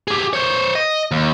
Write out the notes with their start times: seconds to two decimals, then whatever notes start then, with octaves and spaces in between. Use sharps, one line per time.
0.08 G4 G#4
0.33 C5 C#5
0.75 D#5
1.11 D#2